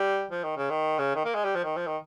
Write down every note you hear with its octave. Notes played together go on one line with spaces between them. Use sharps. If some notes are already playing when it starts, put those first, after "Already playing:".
Already playing: G3
F3
D#3
C#3
D#3
C#3
D#3
A#3
G#3
G3
F3
D#3
F3
D#3